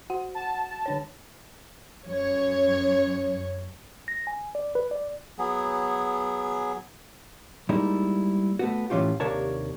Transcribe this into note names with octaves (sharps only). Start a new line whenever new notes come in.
F#4 F#5
A5
D3 D4 C#5
F#2 C#5
A#6
G#5
D5
B4
D5
F#3 B3 G#4
G3 G#3 A#3 D#4 E4
A3 B3 F#4
A2 E3 A#3 C#4 F4 G4
D#2 C3 D4 A#4 C#5 A5